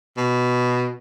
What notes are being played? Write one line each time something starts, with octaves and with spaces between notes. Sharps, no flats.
B2